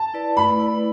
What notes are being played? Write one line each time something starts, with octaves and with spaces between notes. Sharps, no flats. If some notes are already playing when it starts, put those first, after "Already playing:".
Already playing: A5
E4 B4 D5
A3 B5
E4 B4 D5